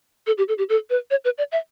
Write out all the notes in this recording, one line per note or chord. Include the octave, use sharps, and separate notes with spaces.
A4
G4
A4
G4
A4
B4
C#5
B4
D5
E5